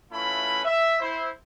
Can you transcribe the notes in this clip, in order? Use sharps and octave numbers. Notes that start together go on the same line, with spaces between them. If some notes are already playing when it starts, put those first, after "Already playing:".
A3 C#4 E4 F4 B4 B5
E5
E4 C5